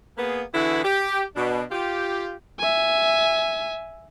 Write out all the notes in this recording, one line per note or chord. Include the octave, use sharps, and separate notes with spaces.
A#3 B3 G#4
D3 E3 B3 E4 F#4 G#4
G4
B2 D4
F4 G4
E5 G#5